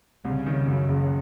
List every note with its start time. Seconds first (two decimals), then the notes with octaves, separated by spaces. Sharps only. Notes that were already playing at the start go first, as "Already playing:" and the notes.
0.25 C2 C#3
0.46 D#3
0.67 F#2
0.88 F#1